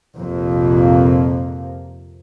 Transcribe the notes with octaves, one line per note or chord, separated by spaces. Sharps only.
A#1 F2 C3 F3 A#3